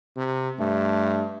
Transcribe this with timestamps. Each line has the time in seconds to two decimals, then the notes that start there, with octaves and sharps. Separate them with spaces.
0.17 C3
0.59 G2 A3